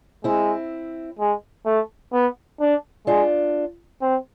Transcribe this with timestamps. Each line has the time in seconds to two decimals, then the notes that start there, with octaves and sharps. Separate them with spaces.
0.24 G#3 C4 E4
1.19 G#3
1.66 A3
2.13 B3
2.61 D4
3.07 G#3 D4 F4
4.02 C4